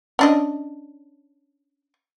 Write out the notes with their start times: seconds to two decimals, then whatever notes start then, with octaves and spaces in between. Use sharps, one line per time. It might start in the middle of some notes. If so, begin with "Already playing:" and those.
0.19 C#4 D4 D#5